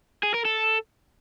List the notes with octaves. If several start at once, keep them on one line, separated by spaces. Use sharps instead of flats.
G#4
A#4
A4